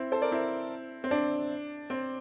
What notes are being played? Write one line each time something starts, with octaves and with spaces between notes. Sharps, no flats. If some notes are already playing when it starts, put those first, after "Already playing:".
Already playing: C4 E4
A4 C5
A#4 D5
C4 E4
C4
D4
C4